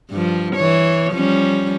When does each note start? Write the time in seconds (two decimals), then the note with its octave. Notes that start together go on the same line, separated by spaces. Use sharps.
0.10 G2 F3
0.56 E3 C#5
1.13 F3 G3 C#4